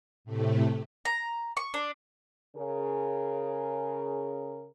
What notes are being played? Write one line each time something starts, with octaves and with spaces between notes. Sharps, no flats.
A2 C3 A3
A#5
C#6
D4
C#3 G#4 A#4